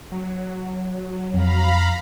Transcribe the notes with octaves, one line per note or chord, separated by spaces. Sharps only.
F#3
F2 F5 A#5 B5